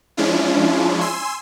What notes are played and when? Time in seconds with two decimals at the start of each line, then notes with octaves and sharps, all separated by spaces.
0.17 F3 G#3 C#4 D4 E4 F4
1.01 G#5 C6 E6